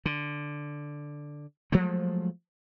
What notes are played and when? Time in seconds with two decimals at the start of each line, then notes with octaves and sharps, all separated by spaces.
0.06 D3
1.72 F3 F#3 G#3 A3